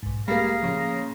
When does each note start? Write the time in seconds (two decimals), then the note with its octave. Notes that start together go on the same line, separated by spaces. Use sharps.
0.03 B1 G#2
0.28 G3 G#3 A#3 G#4 F5 A#5
0.63 A#2 C#3 F3 C#5